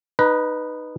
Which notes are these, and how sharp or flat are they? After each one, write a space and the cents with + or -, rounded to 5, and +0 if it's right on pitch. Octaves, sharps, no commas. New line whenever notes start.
D#4 -15 B4 +0 A#5 +30